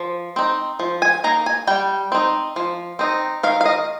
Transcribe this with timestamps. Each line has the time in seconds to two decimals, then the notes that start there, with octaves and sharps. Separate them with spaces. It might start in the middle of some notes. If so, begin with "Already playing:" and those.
Already playing: F3
0.36 C4 D#4
0.80 F3
1.02 G#5
1.24 A#3 D#4 A#5
1.46 G#5
1.67 G3 G5
2.12 C4 D#4
2.56 F3
2.99 C4 D#4
3.43 D#3 F5
3.61 F5
3.65 D#5